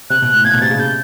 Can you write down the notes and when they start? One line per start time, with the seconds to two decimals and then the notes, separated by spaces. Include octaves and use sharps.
0.10 C3 F#6
0.22 B2
0.34 A2
0.45 A#2 G#6
0.53 B2
0.62 C3 A6
0.70 C#3
0.79 G6